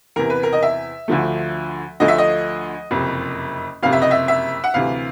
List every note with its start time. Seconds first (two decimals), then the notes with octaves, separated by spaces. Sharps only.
0.16 E2 C3 E3 A#4
0.30 B4
0.43 A#4
0.53 D#5
0.63 E5
1.08 D2 D3 F3 A3
2.00 D2 D3 F3 A3 D#5
2.08 E5
2.18 D#5
2.91 F#1 F2 C3
3.83 F#1 F2 C3 F5
3.93 E5
4.02 D#5
4.11 E5
4.28 E5
4.64 F#5
4.74 D2 C3 E3 F5